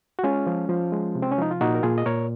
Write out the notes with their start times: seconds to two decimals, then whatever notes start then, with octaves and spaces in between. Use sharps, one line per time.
0.19 F#4
0.23 G#3 C#4 F4
0.47 F3
0.69 F3
0.92 G#3
1.15 C3
1.22 C4
1.32 C#4
1.38 F3 D#4
1.51 F4
1.61 A#2 D#4 F#4
1.75 A#4
1.83 A#2 F4 G#4
1.98 D#5
2.06 A#2 A#4 C#5